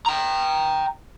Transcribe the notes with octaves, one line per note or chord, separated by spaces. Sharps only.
G5 A#5